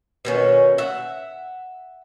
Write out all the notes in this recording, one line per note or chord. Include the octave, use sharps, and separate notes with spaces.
B2 D#3 C#4
E5 F#5